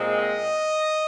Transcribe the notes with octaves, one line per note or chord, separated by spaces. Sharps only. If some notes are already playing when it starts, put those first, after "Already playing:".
Already playing: A#2 G#3 C4
D#5